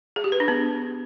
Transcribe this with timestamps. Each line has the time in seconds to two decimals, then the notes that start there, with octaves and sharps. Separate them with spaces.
0.16 G#4
0.24 G4
0.32 B4
0.40 D4
0.48 B3